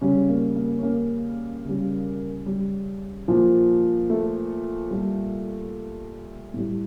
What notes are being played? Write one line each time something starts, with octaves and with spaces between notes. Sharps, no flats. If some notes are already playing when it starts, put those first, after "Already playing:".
C#3 G3 C#4
A#3
A#3
C#4
A#3
C#3 G3
G3
A#2 F3
A3
A#2 G3
A2 G3